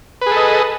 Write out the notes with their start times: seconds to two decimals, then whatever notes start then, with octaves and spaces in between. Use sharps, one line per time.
0.21 B4
0.26 G#4
0.31 A4
0.36 D#5